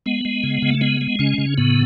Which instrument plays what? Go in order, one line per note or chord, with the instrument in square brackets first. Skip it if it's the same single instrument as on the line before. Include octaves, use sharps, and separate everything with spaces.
[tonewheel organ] G#3 B3
G#3
C#3
C#3
A3
G#3 B3
G#3
C#3 C#4
C#3
A2 B3